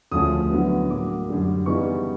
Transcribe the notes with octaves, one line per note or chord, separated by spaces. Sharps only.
D2 C#3 F3 A3 C#4 D#6
D3 F#3 B3 E4
A2 F#3 A#3 D6
F#2 D3 G3
C#3 E3 G3 B3 D#4 C#6